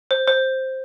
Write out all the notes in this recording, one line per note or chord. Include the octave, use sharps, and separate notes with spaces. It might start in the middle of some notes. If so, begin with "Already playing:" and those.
C5
C5